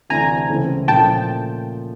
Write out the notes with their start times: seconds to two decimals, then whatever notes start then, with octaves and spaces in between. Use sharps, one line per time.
0.10 D2 C3 E3 A3 D4 G#5 A#5
0.49 C#2 C#3 E3 A3 C4
0.88 A#2 F3 A3 C#4 G5 A5